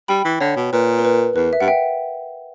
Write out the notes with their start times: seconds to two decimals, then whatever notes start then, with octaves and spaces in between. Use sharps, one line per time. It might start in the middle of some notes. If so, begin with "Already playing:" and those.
0.08 G3 G5 B5
0.25 E3
0.40 D3 C#5
0.56 B2
0.73 A#2 B4
0.99 A#4
1.05 B4
1.36 E2 B4
1.53 E5
1.61 G2 F#5
1.68 E5 G5